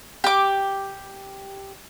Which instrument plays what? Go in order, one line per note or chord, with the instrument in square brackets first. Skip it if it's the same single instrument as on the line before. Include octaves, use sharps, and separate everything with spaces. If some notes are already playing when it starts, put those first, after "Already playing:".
[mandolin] G4 D6